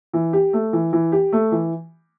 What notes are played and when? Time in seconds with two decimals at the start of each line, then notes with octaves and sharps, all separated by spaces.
0.13 E3
0.33 G4
0.53 A3
0.73 E3
0.93 E3
1.12 G4
1.33 A3
1.52 E3